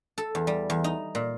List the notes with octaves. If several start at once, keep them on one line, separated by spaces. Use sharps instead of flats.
A4
E2
G3
E2
D#4
A#2